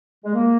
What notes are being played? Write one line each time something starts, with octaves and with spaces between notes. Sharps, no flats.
G#3
A#3